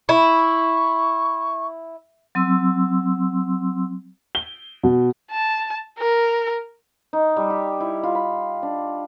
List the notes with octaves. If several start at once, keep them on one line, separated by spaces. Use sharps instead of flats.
E4 C#6
F#3 C4 C6 E6
G7
B2
A5
A#4
D#4
G3
G4
E4
F4
B5
D4